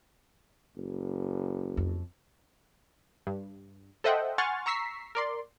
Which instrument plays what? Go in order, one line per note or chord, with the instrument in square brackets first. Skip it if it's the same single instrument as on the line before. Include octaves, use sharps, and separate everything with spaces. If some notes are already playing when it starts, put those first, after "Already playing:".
[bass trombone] F#1
[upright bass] F2
[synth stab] G2
A4 C5 D#5 E5 F#5 G5
F#5 G#5 C6 C#6 F6 A6
A#5 C#6 E6 B6 C7
A#4 D5 C6